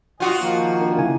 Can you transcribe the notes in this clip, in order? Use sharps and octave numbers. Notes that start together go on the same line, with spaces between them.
F4 F#4 D#5 G#5
D#3 F3 A#3
D4 A#4
C#3 E4 G#5